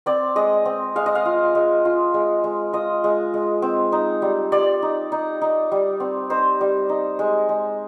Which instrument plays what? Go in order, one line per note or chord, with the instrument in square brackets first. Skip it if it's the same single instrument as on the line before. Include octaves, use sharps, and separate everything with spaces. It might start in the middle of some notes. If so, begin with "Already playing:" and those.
[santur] C4 D5
G#3 D#5
C4
G#3 F5
D#5
F5
F4
G#3
F4
G#3
G#3
F4 D#5
G#3
G#3
C4
D#4
G3
G3 D5
D#4
D#4
D#4
G3
C4
D#4 C5
G3
D#4
G#3
G#3